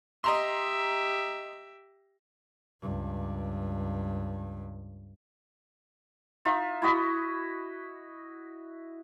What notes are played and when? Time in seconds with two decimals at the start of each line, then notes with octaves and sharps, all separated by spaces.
0.24 G4 D#5 E5 A#5 C6
2.81 C#2 G2
6.45 D#4 F4 E5
6.82 E4 F#4 D#5 B5